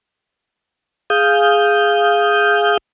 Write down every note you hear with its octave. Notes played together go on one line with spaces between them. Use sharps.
G#4 F5 D#6 G6